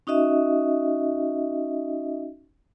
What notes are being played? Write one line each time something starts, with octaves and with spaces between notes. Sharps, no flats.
C#4 D#4 F#4 D#5 E5